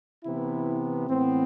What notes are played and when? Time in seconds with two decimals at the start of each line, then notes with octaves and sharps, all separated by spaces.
0.25 C3 E3 B3 E4
1.08 A2 E3 B3 C4